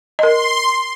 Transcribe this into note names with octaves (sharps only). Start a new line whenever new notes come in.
A#4 D#5 C6